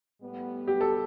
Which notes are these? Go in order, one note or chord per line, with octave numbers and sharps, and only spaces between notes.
A2 G3 B3
G4
A4